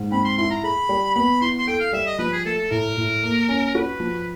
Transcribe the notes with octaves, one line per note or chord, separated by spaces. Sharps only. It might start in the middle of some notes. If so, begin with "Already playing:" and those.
Already playing: G#2
C4 B5
C6
E4 C6
A#5
G#4 B5
G3
B3 B5
E4 C6
C6
A4 G5
F5
G3 E5
D#5
F3 B4
G#4
A3 A4
A4
A2 A#4
A2
A#3
C#4
F#4 B4
F3